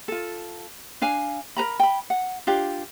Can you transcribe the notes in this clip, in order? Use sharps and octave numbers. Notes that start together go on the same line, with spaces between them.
F4 A4
D4 F5 G#5
A#4 B4 A#5 B5
G5 B5
F#5
D4 F4 G4